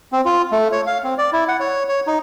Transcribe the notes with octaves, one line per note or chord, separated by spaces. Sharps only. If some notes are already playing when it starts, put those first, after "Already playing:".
C4
F4
A3
C#5
F5
C4
D5
E4
F#5
C#5
C#5
D#4